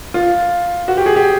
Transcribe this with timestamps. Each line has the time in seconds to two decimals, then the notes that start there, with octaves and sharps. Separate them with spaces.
0.14 F4
0.88 F#4
0.97 G4
1.06 G#4
1.16 G4